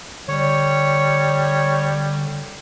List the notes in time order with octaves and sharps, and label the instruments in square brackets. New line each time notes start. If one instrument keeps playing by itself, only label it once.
[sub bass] D3 [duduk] G3 [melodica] C#5